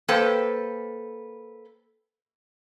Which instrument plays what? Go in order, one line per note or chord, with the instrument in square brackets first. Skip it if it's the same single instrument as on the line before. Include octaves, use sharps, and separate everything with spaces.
[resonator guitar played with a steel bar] A#3 A4 B4 C5 G5